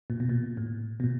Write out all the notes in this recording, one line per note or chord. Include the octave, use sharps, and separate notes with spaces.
A#2
B2
A#2
A2
B2
A#2